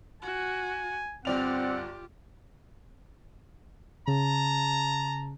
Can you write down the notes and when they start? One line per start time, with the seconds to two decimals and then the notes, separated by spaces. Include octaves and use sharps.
0.22 F#4 G#5
1.25 G1 C4 F4 G4 D5 F#5 F7
4.07 C#3 A5 A#5